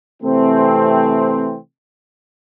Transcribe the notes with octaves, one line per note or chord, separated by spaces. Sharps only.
C3 E3 A3 C4